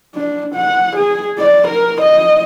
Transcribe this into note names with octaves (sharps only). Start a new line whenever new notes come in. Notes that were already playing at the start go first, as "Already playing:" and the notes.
D4
F#5
G#4
D5
A#4
D#5